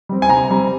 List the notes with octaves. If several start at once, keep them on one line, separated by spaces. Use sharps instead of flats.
G3 C4
G#5
C3 A#5
G3 C4